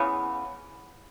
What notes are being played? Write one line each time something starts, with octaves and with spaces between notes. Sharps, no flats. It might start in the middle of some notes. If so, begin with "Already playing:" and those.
Already playing: C#3 E3 B3